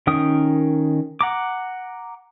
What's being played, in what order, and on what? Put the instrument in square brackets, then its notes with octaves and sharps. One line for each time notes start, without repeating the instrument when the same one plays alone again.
[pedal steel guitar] D#3 C#4 A#4 G5 D#6
F#5 A#5 D6